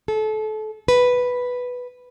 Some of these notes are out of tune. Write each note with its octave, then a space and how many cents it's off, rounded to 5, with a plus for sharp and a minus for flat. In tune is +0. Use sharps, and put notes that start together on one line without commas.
A4 -30
B4 +0